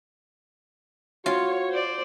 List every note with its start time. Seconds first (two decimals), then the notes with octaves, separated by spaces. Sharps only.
1.26 F4 F#4 C#5
1.70 C5 D5